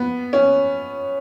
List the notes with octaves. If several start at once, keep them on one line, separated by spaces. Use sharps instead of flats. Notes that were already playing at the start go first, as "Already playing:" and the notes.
Already playing: B3
C#4